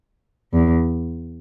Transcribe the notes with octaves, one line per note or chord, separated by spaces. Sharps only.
E2